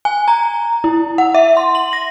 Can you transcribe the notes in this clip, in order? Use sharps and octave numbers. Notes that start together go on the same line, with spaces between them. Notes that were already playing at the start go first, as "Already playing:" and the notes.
G#5
A#5
E4
F#5
E5
C6
F#7
A#6